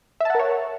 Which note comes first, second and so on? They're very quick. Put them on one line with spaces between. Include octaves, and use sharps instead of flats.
E5 A5 F#5 A#4 C#5